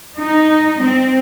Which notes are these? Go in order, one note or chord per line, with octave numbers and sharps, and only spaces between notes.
D#4
C4